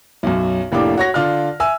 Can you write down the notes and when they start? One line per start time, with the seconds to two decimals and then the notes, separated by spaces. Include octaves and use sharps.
0.23 B1 F#2
0.72 F1 A2 A#3 D4 G4 D6
0.97 F#4 C#5 A#6
1.14 D3 F4 D5 F6
1.60 E5 G#5 E6